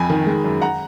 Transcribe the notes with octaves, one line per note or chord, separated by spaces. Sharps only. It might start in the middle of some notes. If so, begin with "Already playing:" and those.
Already playing: F2 G#5 B5
D#3
G#3
F#2
F#5 A#5